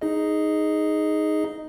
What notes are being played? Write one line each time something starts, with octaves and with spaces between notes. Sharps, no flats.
D#4 G#4 D#5